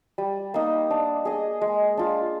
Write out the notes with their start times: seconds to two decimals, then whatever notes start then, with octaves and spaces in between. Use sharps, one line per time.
0.18 G3
0.54 A#3 D#4
0.90 D4
1.25 G#4 D#5
1.61 G#3
1.97 D4 F4